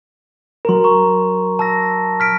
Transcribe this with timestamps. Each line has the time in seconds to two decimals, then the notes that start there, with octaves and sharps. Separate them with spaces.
0.65 F#3 A#4 A#5 C6
0.84 A#5 C#6
1.59 A5 E6 A#6
2.20 F6 B6 D7